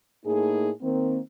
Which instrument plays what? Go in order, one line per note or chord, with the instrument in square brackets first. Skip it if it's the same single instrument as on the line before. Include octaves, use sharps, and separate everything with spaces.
[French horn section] A2 A#3 D#4 G#4
D#3 A#3 C4